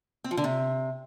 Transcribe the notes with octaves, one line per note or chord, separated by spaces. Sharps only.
C4
F3
D3
C3